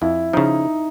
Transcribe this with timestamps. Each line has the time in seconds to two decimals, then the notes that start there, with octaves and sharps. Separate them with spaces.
0.01 F2 E4
0.33 C#3 F3 D#4